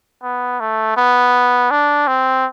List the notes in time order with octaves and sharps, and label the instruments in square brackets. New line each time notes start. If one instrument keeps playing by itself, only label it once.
[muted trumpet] B3
A3
B3
D4
C4